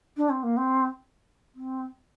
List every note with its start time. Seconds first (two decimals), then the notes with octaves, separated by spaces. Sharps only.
0.17 D4
0.29 C4
0.43 A#3
0.57 C4
1.55 C4